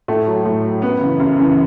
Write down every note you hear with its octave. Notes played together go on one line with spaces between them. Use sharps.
A2 A3
F#3
A2
F#3
F#2 B3
C#3 E3
F#2
C#3 E3